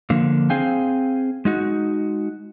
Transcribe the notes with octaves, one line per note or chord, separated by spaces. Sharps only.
D3 F3 A#3
C4 G#4 F5 G5 G#5
G#3 D#4 F#4